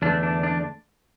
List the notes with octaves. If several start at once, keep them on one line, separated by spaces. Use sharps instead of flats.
E2 D3 A3 D4
D4
D4